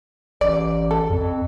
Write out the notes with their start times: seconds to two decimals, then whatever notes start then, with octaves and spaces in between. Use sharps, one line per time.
0.41 A1 D5
0.91 A4
1.10 F2